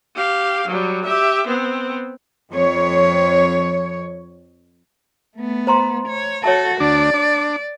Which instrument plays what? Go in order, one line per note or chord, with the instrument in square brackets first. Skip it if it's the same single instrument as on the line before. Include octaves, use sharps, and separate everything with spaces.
[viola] G4 F5
F#3 G3
G4 E5
B3 C4
[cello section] F2 C#5
[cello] A3 B3
[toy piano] C5 A#5 C6
[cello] C#5
[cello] F#4 A4 [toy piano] C#5 E5 A5
[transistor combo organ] D2 D4 [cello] D5
[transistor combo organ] D4